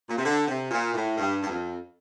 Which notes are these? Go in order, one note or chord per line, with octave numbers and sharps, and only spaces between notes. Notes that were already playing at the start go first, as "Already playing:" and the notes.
A#2
C3
D3
C3
A#2
A2
G2
G2
F2